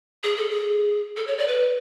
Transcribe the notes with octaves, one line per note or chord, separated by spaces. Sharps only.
G#4
A4
G#4
A4
C#5
D5
B4